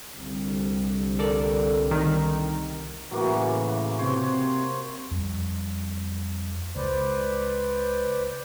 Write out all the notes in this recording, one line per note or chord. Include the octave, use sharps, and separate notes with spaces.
C2 D3 G3
A4 A#4 D5
D#3
A2 C#3 E3 F#3 A#3 F#4
C3 C5 C#5 C6
F2 G3
C#2 B4 C5 D5